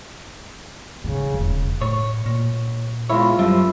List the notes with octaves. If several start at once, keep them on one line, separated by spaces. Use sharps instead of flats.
G#2 C#3 B3
E1 F2
A2 C#5
A#2
G#3 B3 E4 F4 C#5
F#2 F3 G3 E5